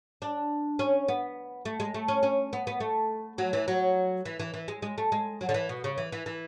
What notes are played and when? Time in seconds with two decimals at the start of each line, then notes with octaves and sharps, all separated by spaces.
0.22 D4
0.79 C#4
1.08 B3
1.65 A3
1.80 G#3
1.94 A3
2.08 C#4
2.23 C#4
2.53 B3
2.67 B3
2.80 A3
3.38 F#3
3.53 E3
3.68 F#3
4.25 E3
4.40 E3
4.54 E3
4.68 G#3
4.82 G#3
4.98 A3
5.12 G#3
5.41 F#3
5.49 D3
5.54 E3
5.69 B2
5.84 C#3
5.98 E3
6.12 E3
6.26 E3